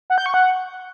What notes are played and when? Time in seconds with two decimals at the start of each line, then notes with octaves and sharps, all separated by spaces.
0.10 F#5
0.18 G6
0.26 C#6
0.34 F#5